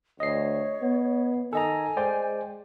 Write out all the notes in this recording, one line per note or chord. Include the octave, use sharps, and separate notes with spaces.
D2 C#5 D#5 C7
B3
D#3 A4 D#5 G#5 A#5
G#3 C5 D5 G5